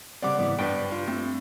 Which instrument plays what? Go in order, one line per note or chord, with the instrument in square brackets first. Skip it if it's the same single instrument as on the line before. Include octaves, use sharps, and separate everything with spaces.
[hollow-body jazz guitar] C#3 G3 C4 [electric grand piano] D5 F#5 D6
[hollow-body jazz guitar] G#2 E3 B3
[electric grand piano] G2 [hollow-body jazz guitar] B4 D5 G5
[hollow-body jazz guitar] F4
A3 C4